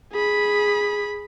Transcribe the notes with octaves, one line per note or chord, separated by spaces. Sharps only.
G#4 B5